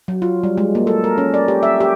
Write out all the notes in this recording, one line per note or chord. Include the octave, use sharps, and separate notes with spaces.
F#3
F4
G3
G#3
A#3
A4
A#4
C#4
D5
G4
E5
G4